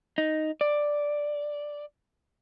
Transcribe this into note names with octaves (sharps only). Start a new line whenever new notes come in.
D#4
D5